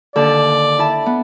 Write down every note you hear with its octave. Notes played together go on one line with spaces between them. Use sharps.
D#2 D3 A4 D5
E4 A5
B3